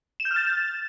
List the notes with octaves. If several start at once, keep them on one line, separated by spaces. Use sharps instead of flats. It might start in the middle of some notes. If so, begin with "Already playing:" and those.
E7
G6
F6
A6